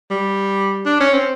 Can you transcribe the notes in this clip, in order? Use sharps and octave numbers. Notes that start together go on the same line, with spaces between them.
G3
D4
C#4
C4